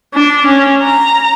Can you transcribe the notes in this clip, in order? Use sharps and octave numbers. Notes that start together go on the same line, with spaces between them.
D4
C#4
A#5